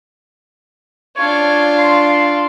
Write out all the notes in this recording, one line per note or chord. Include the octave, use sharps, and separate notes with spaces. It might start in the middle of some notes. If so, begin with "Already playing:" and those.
D4 F4 C#5
C6